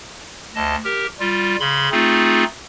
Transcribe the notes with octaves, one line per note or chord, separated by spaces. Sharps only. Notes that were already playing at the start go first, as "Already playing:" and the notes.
D2 D#5 A5
G4 A#4
G3 F4
C#3 B5 C6
A3 C4 D#4 F4 G#4